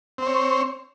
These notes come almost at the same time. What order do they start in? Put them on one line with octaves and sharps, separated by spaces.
C4 C5 C#5